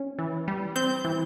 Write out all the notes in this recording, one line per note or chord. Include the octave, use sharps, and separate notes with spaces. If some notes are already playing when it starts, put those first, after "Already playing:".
Already playing: C#4
E3
G3
C4 G6
E3